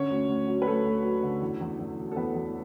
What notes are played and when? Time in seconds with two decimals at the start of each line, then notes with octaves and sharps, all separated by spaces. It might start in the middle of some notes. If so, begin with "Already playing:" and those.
Already playing: D3 C#4 C#5
0.10 D2
0.29 D2
0.48 F#3
0.62 B4
0.66 F#3 A3 A4
0.85 D2
1.04 F#3
1.23 D3
1.42 E2
1.61 E2
1.79 E2
1.98 B2
2.12 A4
2.16 E2 B3 B4
2.35 E2